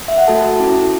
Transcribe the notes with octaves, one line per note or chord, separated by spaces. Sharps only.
E5
F#5
A3 F#4 A4 A5
C#4 E4 A4